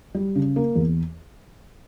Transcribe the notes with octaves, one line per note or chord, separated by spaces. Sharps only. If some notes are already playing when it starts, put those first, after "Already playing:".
G3
C#3
A#3
E2